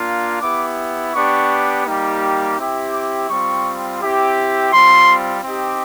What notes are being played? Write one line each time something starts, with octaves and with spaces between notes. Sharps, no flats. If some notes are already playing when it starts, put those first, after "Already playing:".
Already playing: A#3 D4 F4
B3 E4 G4 D6
B3 D4 G4 C#6
G3 A#3 D#4 G4
C4 E4 G4
D6
G3 C4 F4 C#6
C4 E4 G4
G3 C4 F4 C6
C4 D#4 G4